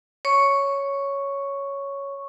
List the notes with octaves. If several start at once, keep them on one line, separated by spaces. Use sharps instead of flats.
C#5 C#6